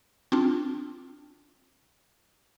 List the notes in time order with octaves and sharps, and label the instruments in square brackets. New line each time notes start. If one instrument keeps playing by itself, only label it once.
[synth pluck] C4 D4 F4